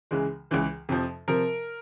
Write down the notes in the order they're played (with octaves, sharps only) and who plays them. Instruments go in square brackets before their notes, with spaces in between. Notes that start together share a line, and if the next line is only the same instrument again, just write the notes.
[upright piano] C#2 C#3 E3 G#3
C#2 C#3 E3 G#3
F2 C3 F3
C3 F3 A#4